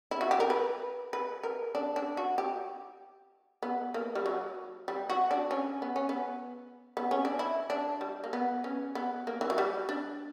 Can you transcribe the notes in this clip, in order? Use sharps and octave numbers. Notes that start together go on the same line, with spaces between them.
E4
F#4
G4
A#4
B4
B4
A#4
D4
D4
F#4
G4
B3
A#3
G3
F#3
G3
F#4
D4
C#4
B3
C#4
B3
B3
C#4
D4
E4
D4
G3
A#3
B3
C#4
B3
A#3
E3
F#3
G3
D4